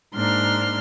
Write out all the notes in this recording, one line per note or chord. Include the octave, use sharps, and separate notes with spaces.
G#2 A#3 D4 C6 F6